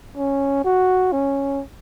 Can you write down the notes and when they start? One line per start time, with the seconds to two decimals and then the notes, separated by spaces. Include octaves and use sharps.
0.17 C#4
0.64 F#4
1.12 C#4